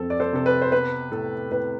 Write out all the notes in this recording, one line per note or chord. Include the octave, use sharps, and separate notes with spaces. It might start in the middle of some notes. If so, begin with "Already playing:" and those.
Already playing: F2 F3 C4 A4
D5
A4 C5
C3 A4
B4
C5
B3 B4
A2 A4
A2 B4